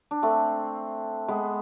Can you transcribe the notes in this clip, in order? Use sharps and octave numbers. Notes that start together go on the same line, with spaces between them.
D4
A3 C4
G#3 B3